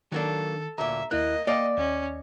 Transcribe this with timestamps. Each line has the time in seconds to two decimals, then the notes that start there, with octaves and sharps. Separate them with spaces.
0.12 D#3 F#3 A#3 D4 A4
0.78 D2 A#2 E5 A#5
1.11 D#2 A#3 E4 D#5 F#6
1.47 A#3 D5 D#5 F5 G5
1.77 D#2 C#4